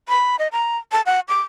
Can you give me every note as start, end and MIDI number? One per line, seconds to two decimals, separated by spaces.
0.09 0.36 83
0.39 0.48 75
0.52 0.77 82
0.92 1.02 81
1.06 1.20 78
1.28 1.41 86